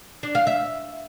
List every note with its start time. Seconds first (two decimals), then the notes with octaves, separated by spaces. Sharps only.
0.23 D4
0.35 F5
0.47 E5